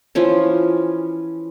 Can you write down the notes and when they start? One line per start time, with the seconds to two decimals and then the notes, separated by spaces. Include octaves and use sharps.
0.15 E3 F3 C#4